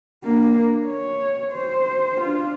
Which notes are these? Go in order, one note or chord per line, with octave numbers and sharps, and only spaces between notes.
A#3 D4
C#5
C5
D4 F4